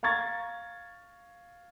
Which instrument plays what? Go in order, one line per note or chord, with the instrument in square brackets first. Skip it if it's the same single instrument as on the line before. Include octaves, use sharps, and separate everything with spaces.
[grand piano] F5 A#5 C#6 G#6 A6